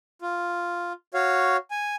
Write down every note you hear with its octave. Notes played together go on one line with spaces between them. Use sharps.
F4
F#4 C#5 F5
G#5